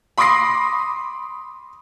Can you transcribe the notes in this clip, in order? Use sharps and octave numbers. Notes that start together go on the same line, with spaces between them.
B5 C6 D6 D#6 A#6 C7